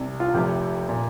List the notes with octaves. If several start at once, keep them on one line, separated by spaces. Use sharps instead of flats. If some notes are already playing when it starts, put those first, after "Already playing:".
Already playing: C2 C3
F4
F1 F2 C3 G4
A#2